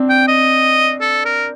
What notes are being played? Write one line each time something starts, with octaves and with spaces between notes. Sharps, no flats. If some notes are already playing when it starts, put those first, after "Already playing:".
Already playing: C4 D4
G5
D#5
A4
A#4